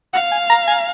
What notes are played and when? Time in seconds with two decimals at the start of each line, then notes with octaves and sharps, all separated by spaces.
0.14 F5 F#5
0.32 G#5
0.50 A#5
0.68 G#5